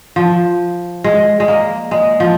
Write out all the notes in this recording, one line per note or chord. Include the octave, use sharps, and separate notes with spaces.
F3
G#3
G#3
A#3
G#3
F3